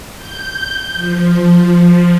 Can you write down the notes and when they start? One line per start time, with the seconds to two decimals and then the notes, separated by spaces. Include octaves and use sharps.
0.16 G6
0.94 F3